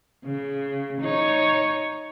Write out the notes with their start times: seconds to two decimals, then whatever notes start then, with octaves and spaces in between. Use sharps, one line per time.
0.24 C#3
1.01 D#4 C#5